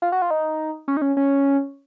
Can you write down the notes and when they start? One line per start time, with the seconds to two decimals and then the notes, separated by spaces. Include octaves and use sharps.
0.02 F4
0.12 F#4
0.22 F4
0.31 D#4
0.88 C#4
0.97 D#4
1.02 C#4
1.17 C#4